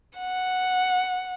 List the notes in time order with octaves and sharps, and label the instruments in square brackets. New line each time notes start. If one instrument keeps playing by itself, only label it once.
[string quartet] F#5